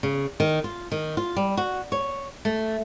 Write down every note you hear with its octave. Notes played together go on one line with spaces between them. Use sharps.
C#3
D#3
F4
D#3
F4
G3
F#4
C#5
A3